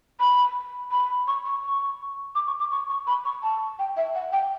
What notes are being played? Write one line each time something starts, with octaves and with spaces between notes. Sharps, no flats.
B5
B5
C#6
C#6
C#6
D6
C#6
D6
C#6
C#6
B5
C#6
A5
G5
E5
F#5
G5